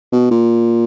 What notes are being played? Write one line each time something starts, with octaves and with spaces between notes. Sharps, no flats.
B2
A#2